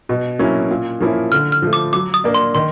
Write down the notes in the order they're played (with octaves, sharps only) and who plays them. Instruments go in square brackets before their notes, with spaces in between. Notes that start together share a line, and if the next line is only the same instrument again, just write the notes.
[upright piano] B2
F#3 A#3 C#4 E4
A#2
F3 A#3 C#4 E4
[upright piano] D3 [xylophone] F6
[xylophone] F6
[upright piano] F3 A3
[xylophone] D6
[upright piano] F#3 [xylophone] D6
[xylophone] D#6
[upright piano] A#3 D4
[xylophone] C6
[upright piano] D#3 [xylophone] C6